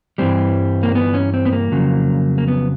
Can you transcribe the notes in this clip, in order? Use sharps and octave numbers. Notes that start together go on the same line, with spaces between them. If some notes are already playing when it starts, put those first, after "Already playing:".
G2 E3 G3 C4
A#3
B3
C#4
C4
B3
A#3
F2 C#3 F#3
A#3
B3